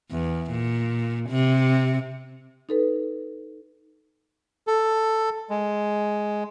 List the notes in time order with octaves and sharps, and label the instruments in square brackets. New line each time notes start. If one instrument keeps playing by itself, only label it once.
[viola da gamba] E2
A#2
C3
[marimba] D#4 A4 B4
[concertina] A4
G#3